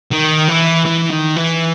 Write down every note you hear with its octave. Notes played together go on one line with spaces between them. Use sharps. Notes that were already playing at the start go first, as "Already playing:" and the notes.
D#3
E3
E3
D#3
E3